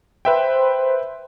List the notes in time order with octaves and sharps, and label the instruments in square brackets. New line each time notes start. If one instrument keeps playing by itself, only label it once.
[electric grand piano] B4 E5 G5 [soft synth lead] C5